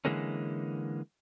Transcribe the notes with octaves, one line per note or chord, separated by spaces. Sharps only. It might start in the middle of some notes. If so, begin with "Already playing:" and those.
D3 E3 G#3 A#3 C#4